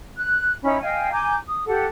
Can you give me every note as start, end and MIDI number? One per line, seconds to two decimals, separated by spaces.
0.18 0.55 90
0.63 0.79 61
0.63 0.79 63
0.63 0.79 64
0.63 0.79 83
0.81 1.09 75
0.81 1.09 77
0.81 1.09 79
0.81 1.09 80
1.12 1.35 80
1.12 1.35 82
1.12 1.35 86
1.12 1.35 91
1.47 1.65 87
1.66 1.85 67
1.66 1.85 69
1.66 1.85 78